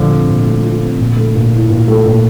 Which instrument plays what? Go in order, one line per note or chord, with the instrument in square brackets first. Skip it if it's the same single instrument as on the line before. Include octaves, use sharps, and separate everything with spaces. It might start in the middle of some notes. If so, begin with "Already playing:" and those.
Already playing: [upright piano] A#2 A3 F4 [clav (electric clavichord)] D3 F3
[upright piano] C4
A#2
A3
F4
C4
A#2
A3
A#2
E4
A#2
A3
A#2